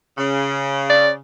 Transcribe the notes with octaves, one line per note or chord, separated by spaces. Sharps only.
C#3
D5